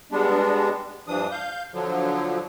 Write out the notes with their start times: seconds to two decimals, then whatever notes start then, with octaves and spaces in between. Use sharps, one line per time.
0.11 G3 G#3 B3 D4
1.08 G2 E3 F3 D4 D#6
1.31 F5 G6
1.73 D3 F3 F#3